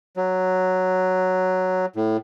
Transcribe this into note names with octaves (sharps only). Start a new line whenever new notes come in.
F#3
A2